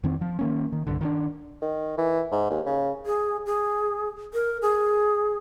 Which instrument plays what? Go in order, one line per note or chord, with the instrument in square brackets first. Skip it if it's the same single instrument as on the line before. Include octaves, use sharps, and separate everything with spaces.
[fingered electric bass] F2 D#3 C4
F3
D#3 A#3 C#4
D#3
C2 G2 D3
D#3 E3 D4
[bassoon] D#3
E3
G#2
D#2
C#3
[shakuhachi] G#4
G#4
A#4
G#4